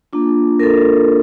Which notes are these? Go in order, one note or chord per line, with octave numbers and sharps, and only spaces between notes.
A#3 D4 F4
A#4
A4